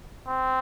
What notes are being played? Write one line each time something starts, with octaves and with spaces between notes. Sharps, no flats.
C4